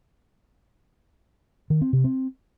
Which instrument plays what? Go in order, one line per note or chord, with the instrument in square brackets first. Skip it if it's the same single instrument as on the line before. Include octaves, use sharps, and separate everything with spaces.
[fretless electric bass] D#3
C4
C3
C4